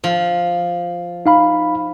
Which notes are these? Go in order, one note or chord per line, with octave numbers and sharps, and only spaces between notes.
F3
D#4 F5 B5